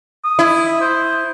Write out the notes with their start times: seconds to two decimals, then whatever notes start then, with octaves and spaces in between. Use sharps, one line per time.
0.24 D#6
0.39 E4
0.81 C5